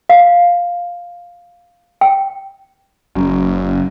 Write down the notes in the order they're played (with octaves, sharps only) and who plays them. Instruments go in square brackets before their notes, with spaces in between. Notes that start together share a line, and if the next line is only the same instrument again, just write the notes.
[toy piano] F5
G5
[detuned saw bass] F#1 [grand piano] F#2